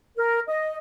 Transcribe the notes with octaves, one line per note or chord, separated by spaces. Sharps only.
A#4
D#5